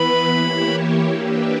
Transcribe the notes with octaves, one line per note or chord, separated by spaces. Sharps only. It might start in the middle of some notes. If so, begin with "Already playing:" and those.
Already playing: E3 B3 E4 B4 B5
E3 A#3 E4 G4 C#5
A#3 D4 G4 B4 E5